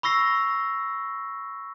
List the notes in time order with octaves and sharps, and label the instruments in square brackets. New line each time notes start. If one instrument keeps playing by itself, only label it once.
[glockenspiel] B5 C#6 E6 A#6 C7